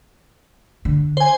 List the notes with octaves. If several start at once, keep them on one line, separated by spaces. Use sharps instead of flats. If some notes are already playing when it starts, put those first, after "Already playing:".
D3
C5 G#5